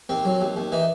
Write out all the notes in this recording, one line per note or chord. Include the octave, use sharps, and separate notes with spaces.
D#2 C4
F#3
D#2
D#2
E3 D#4